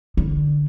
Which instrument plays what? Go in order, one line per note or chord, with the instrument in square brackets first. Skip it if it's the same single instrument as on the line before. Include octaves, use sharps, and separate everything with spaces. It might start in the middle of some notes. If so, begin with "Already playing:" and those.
[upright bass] D3